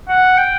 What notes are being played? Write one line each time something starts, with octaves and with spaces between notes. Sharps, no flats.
F#5
G5